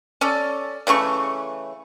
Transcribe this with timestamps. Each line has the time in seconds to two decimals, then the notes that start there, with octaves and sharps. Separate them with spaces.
0.21 C#4 A4 D5
0.87 C#3 E3 A3 C#6